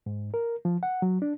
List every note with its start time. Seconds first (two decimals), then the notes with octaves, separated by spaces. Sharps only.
0.06 G#2
0.34 A#4
0.65 F3
0.83 F#5
1.02 F#3
1.22 D4